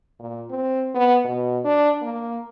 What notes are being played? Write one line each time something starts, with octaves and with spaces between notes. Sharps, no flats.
A#2
C4
B3
B2
D4
A#3